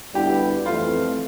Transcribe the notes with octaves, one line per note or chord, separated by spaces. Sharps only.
D2 D3 G3 B3 E4 G4
F2 E3 A3 F4